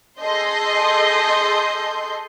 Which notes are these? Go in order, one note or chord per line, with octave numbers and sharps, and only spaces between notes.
G#4 A4 D#5 C6 G6